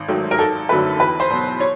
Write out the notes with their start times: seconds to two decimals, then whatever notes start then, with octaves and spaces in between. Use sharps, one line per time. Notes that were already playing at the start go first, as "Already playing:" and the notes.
Already playing: G#1
0.08 G#2 D#3 F#3 A3
0.31 A#4
0.39 G#1 A4
0.69 F#2 D3 F#3 A3 B4
0.99 E2 B4
1.20 C5
1.30 B2 F#3 B3
1.60 C#5